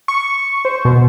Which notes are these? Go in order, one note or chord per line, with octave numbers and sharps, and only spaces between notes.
C#6
C5
B2